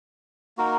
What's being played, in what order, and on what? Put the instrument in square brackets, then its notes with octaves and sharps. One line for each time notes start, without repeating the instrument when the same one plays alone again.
[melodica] A#3 D#4 F#4 A#4